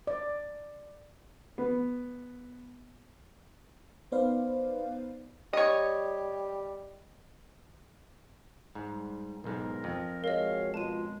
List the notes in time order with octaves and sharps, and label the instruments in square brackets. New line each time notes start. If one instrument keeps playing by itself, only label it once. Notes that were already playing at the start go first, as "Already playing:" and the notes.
[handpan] D5
[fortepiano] B3
[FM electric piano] B3 D#4 B4 C5 D5 F5
[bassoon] G3 [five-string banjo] C#5 D#5
[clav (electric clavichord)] G#2 [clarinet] G3
[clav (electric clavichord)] B1 G#2 [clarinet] A#4
[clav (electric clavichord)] F2
[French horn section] G#3 F#4 C#5 [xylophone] A#4 D#5 [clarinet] F5
[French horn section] B2 F4 [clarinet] G#3 [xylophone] A5 D#7